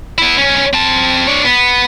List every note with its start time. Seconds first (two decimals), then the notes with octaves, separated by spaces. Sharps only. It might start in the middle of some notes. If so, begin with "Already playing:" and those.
0.18 B3 E4
0.37 B1 C#4
0.73 C4 A5
1.27 D4 C#5
1.44 B3